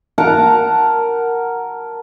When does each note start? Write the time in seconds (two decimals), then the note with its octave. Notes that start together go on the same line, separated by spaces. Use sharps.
0.18 A#4 F#5 A5 A#5